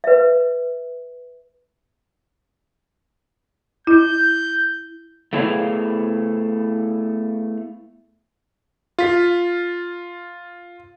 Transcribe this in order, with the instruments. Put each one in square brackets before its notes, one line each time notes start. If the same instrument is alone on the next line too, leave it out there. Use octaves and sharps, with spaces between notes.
[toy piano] B4 E5
[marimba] E4 [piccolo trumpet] G6
[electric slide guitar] A3 B3 E4 G#4 C#5 F5
[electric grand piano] F4 B6